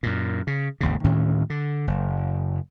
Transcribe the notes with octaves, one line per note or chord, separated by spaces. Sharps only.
F#2 A#2
C#3
G#1 D#2 C#3
D2 A2 D#3 C#4
D3
F#1